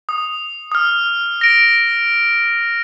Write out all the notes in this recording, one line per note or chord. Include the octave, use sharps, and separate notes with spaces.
D#6
D#6 F6
A#6 D7